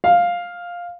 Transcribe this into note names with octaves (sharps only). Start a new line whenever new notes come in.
F5